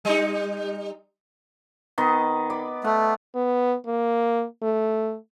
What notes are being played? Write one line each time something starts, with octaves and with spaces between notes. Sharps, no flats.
G3 D#4
D#3 B3 D#5
D5 B5
A3 F#5
B3
A#3
A3